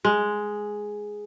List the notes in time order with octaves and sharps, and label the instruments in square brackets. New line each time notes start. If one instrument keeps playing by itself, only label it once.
[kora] G#3